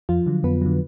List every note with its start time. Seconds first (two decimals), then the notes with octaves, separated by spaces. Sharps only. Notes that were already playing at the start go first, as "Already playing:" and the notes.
0.09 F2 F3 F4
0.27 D3 F#3
0.44 F2 B3 B4
0.61 D3 F#3